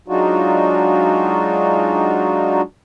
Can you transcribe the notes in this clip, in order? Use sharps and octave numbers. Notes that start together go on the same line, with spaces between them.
F#3 G#3 D4 D#4 F4 F#4